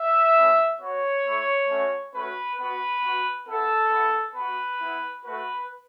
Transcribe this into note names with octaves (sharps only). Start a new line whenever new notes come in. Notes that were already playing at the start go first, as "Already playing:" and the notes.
Already playing: E5
A3 C#4 E4
B3 F#4 C#5
A3 E4
A3 C#4 F#4
A3 C#4 F#4 B4
B3 F#4 B4
B3 F#4
B3 E4 A4
B3 E4
B3 F#4 B4
B3 E4
A3 F#4 B4